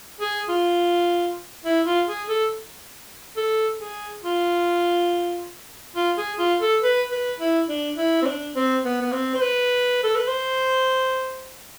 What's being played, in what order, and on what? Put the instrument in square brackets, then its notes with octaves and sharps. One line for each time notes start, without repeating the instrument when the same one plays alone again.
[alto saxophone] G#4
F4
E4
F4
G#4
A4
A4
G#4
F4
F4
G#4
F4
A4
B4
B4
E4
D4
E4
C4
D4
C4
B3
B3
C4
C5
B4
A4
B4
C5